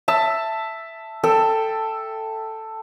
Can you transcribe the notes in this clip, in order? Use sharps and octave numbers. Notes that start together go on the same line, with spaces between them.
E5 A5 E6
A4 G5 E6